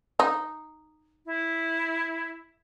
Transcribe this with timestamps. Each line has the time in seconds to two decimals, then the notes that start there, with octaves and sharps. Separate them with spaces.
0.20 D#4
1.26 E4